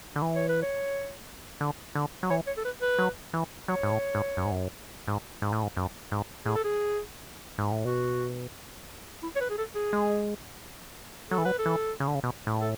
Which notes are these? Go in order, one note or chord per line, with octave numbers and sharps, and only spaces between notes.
D3
E3
C#5
B4
C#5
D3
D3
F#3
E3 C#5
C#5
A4
B4
B4
F#3
E3
F#3 C#5
G#2
A2
G#2
F#2
G#2
F#2
G#2
G#2
A2
G#2
F#2
G#2
A2 G#4
A4
G#4
G#2
A2
B2 F#4
E4
C#5
B4
G#4
A4
G#4
G#3
F#3 A4
E3
F#3 B4
A4
E3
C#3
D3
C#3
B2
A2
A4